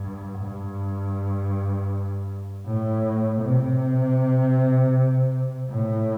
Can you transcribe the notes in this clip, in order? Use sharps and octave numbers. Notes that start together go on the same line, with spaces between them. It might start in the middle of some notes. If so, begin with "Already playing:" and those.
Already playing: G2
G2
A2
C3
A2